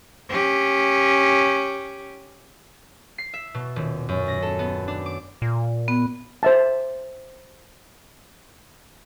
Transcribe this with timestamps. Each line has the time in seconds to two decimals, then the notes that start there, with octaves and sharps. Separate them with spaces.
0.29 C#4 G4
3.18 C7
3.34 E5
3.54 B2
3.76 D#1
4.09 F#2
4.28 A#6
4.42 A4
4.59 B3
4.88 D4
5.06 D6
5.42 A#2
5.88 B3
6.43 C5 E5 A5